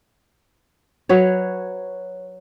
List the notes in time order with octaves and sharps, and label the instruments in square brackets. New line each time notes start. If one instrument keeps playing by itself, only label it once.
[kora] F#3 B4 C#5